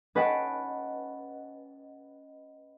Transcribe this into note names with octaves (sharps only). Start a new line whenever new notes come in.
C#4 B4 D#5 F#5 G5 A5